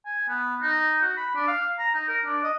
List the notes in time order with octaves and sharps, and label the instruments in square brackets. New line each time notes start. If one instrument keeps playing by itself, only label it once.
[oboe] G#5
B3
D#4
F#4
B5
D4
F5
A#5
D#4
A#4
D4
D#5